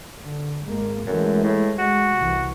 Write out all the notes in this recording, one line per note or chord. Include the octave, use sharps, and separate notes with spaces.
D3
G#1 G#3 A#3
F#2 E3 G#3 A3
A2
G#3 F#4
C2 C3 E3